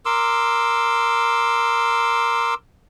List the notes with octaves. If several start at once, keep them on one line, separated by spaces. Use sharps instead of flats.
A#4 C6 D6 E6